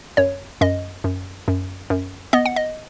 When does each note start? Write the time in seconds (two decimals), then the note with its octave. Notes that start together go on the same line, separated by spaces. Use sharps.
0.17 F#2 C#5
0.61 F#2 D#5
1.04 F#2
1.48 F#2
1.90 F#2
2.33 B3 D#5
2.46 F#5
2.56 D#5